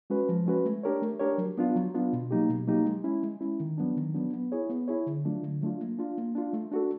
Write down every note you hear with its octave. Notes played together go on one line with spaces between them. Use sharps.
G#3 C#4 F#4 B4
F3
G#3 C#4 F#4 B4
A3
D4 G4 A#4 C#5
A3
D4 G4 A#4 C#5
F#3
B3 D4 F4
F#3
B3 D4 F4
B2
F#3 A#3 D#4 G4
B2
F#3 A#3 D#4 G4
G#3
C#4 E4
G#3
C#4 E4
D#3
F#3 B3 D4
D#3
F#3 B3 D4
B3
E4 G#4 C#5
B3
E4 G#4 C#5
D3
F#3 A3 D4 F4
D3
F#3 A3 D4 F4
A#3
D4 F4
A#3
D4 F4
A3
D4 F#4 A4